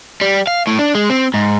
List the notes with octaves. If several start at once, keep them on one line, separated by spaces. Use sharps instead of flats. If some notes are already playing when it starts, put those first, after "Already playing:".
G3
F5
A2
D4
G#3
C4
G#2